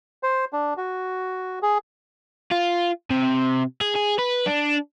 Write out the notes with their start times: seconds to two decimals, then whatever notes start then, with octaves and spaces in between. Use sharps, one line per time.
0.23 C5
0.53 D4
0.77 F#4
1.62 G#4
2.51 F4
3.10 C3
3.81 G#4
3.95 G#4
4.19 B4
4.47 D4